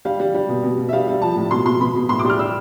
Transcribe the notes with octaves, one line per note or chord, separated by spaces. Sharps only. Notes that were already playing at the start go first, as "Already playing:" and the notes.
G3 F5
G3
G3
B2
B2
B2
E5
G3 F5
G3
F3 A5
A2
B2 C6
B2 C6
B2 B5
B2
A2 C6
D6
G3
F6
G3 E6